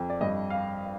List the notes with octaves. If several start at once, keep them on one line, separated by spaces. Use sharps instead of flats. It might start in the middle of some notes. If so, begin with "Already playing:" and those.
Already playing: F2
D5
G2 D#5
F5